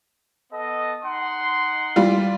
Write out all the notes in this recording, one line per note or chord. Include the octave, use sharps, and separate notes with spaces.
B3 A4 D#5
D#4 F#5 C6
E3 G3 F4